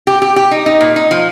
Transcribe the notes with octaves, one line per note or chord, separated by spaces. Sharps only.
G4
G4
G4
D#4
D#4
A#2
D#4
F3